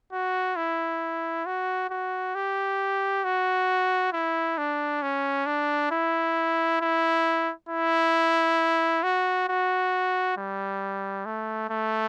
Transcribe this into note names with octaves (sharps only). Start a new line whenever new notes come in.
F#4
E4
F#4
F#4
G4
F#4
E4
D4
C#4
D4
E4
E4
E4
F#4
F#4
G3
A3
A3